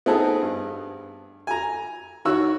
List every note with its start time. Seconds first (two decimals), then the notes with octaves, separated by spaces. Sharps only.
0.06 B3 C4 D#4 G#4 A4
0.42 G2
1.47 G#5 A#5
2.25 D#3 F#4 C#5 E6